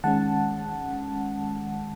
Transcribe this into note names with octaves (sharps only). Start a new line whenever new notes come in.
D#3 G#3 C#4 F#5 A5